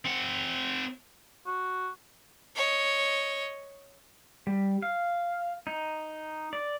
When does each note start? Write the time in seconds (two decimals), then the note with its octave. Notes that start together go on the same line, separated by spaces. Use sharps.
0.05 C4 F#5
1.47 F#4
2.56 C#5 D#5
4.47 G3
4.82 F5
5.67 D#4
6.53 D5